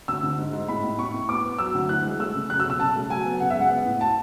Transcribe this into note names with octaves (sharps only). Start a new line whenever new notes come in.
D2 E6
D3
G#2
G#2
A2 B5
A2
A2 C#6
A2
B3 D6
B3
F#3 E6
D2
E3 F#6
G#3
A3 E6
C#3
F#3 F#6
E6
B2
E6
C#3 A5
A3
F#3 G#5
B3
C#3 F#5
E5
G#3
F#5
B3
A2
A5